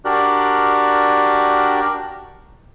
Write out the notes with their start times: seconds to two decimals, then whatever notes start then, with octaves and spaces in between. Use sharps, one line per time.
0.05 D4 F#4 G4 A#4 D5 F#6